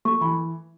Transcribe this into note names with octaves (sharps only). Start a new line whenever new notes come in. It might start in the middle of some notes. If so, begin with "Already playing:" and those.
A3 C#6
E3 B5